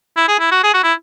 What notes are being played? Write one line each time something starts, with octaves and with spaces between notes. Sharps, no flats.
E4
G#4
E4
F#4
G#4
F#4
E4